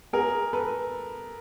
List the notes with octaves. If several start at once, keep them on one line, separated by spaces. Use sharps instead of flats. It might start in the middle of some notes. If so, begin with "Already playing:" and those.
G#4 A#4
A4 B4